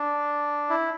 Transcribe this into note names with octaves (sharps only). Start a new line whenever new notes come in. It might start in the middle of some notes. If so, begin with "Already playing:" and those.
Already playing: D4
E4